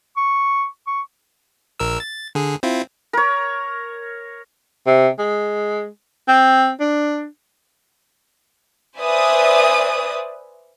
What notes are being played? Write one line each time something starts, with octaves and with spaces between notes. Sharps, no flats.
C#6
C#6
A#1 A#4 E6
A6
D3 G#4
C4 E4 F4
A#4 C#5
C3
G#3
C4
D4
B4 C5 D5 E5 G#5 D#6